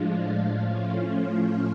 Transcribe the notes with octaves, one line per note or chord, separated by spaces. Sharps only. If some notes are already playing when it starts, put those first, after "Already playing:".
Already playing: A2 F3 G#3 D4 F4
A2 F3 A3 C#4 F4